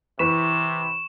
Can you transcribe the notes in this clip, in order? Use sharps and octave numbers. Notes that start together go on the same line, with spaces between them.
C3 E3 B4 C#6 B6 E7